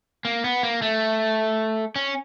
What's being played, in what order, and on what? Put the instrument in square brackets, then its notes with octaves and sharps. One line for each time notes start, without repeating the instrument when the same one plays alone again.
[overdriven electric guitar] A#3
B3
A#3
A3
C#4